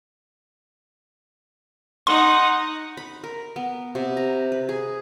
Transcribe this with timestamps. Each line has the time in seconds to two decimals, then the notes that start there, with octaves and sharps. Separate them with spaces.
2.07 D#4 F#5 C6
2.97 B5
3.24 A#4
3.56 B3
3.95 C3
4.17 A#5
4.52 B4
4.69 G#4